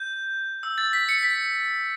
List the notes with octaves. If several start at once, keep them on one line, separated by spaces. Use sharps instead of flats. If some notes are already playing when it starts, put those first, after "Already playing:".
Already playing: G6
E6
A6
B6
C#7
B6